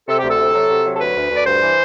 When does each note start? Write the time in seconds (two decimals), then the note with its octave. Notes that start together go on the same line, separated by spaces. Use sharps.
0.08 C3 A4
0.18 G4
0.24 D2
0.30 A4
0.39 C3
0.54 F#3
0.70 C3
0.85 F#3
0.95 A4
1.00 D2 B4
1.16 D2
1.31 D2 D5
1.46 G2 C5
1.62 E3